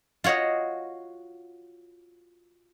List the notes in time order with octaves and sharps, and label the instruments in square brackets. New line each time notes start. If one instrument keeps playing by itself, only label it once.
[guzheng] F4 F#4 C#5 D#5 F5